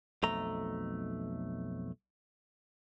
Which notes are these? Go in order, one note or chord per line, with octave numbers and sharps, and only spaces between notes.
B1 F2 A3 A#5